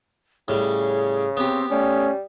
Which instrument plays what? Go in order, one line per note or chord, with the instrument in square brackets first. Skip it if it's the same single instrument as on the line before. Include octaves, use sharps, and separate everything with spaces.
[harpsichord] A2 G3 [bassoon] C#3 [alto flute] G#4
[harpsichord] B3 G4 [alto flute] C4
[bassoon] G3 [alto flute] A3 [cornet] C#4